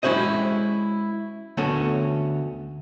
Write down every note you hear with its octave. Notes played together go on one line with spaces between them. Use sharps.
G#3 C#4 E4 F#4 C5 D#5
D2 A3 B3 C#4 F#4 A4